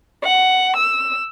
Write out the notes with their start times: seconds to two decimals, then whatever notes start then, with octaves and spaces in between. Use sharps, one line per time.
0.23 F#5
0.76 E6